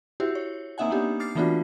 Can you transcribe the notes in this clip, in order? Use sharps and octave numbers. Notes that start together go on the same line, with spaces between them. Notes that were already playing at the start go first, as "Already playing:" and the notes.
E4 F#4 G4 C5
C#5
A#3 C4 D#4 E5 F#5 G#5
A#3 B3 D4 D#4 G4
D6 F6 A6 C7
E3 A3 B3 D4 F4 F#4